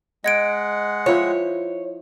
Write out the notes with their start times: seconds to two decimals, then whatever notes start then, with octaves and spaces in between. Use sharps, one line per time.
0.24 G#3 D#5 F#5 G#6 D7
1.06 F3 E4 C5 C#5